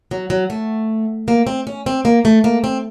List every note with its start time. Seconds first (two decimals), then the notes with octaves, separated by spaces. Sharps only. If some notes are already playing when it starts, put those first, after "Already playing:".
0.11 F#3
0.30 F#3
0.50 A3
1.28 A#3
1.47 C4
1.67 C#4
1.86 C4
2.05 A#3
2.25 A3
2.44 A#3
2.64 C4